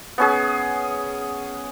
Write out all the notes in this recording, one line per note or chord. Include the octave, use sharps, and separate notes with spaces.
B3 C#4 G#4